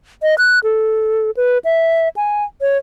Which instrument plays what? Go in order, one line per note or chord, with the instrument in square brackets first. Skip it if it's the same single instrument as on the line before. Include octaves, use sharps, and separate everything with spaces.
[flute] D#5
F#6
A4
B4
E5
G#5
C#5